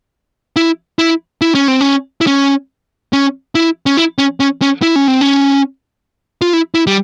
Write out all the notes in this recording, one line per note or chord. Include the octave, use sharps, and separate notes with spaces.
E4
E4
E4
C#4
C4
C#4
E4
C#4
C#4
E4
C#4
E4
C#4
C#4
C#4
E4
C#4
C4
C#4
F4
E4
E4
G3